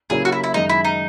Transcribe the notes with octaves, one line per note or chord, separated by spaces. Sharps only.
C#3 F#3 A#3 C#4 E4 G#4
F#4
E4
E4
F#2 D#3 G#3 D#4
E4
D#4